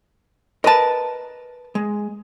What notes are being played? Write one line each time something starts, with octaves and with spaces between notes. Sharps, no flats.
A#4 B4 D#5 A5
G#3